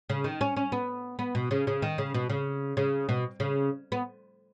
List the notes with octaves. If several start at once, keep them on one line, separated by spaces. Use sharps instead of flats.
C#3
D#3
C#4
C#4
B3
B3
B2
C#3
C#3
D#3
C#3
B2
C#3
C#3
B2
C#3
B3